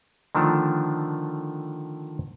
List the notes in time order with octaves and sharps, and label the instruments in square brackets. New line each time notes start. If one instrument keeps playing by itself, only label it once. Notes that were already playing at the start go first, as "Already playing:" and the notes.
[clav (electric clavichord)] D3 D#3 F3 A3 D4